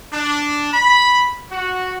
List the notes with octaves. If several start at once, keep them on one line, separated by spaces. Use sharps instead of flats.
D4
B5
F#4